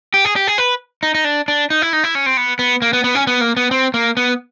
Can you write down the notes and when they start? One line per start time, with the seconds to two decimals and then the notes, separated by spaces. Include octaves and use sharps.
0.14 G4
0.25 G#4
0.36 G4
0.47 G#4
0.58 B4
1.03 D#4
1.15 D#4
1.25 D4
1.48 D4
1.70 D#4
1.82 E4
1.93 D#4
2.04 E4
2.15 C#4
2.26 C4
2.37 B3
2.59 B3
2.82 A#3
2.93 B3
3.04 B3
3.15 C#4
3.27 B3
3.41 A#3
3.57 B3
3.71 C4
3.94 A#3
4.17 B3